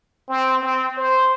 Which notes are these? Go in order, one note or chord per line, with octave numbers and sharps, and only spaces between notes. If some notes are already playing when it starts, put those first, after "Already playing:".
C4
C4
C5